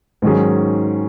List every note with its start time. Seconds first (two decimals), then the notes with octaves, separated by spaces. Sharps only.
0.22 G#2 D#3 F#3 C#4 G#4